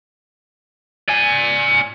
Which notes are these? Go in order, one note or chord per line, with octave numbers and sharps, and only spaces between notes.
D5 G#5